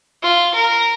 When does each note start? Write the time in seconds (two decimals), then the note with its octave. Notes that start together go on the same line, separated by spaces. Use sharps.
0.23 F4
0.54 A#4